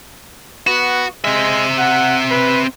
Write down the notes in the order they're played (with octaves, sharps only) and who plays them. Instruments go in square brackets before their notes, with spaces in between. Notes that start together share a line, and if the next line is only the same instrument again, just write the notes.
[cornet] B3 [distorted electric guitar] F#4
[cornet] G#3 [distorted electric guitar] C4 E5
[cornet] F#5
B4